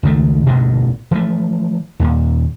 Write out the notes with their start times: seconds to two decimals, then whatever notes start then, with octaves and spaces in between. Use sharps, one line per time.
0.03 C#2 D#3 A3
0.46 A1 D2 G2 B2
1.11 E3 F3 A3
2.00 D#2 A#2